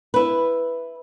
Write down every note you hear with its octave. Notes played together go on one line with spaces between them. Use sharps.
E4 B4